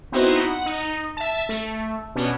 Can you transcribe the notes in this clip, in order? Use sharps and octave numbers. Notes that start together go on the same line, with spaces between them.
B3 C4 D#4 E4 F#4 C5
F#5
D#4
E5 A5
A3
B2 B3 C#4 D4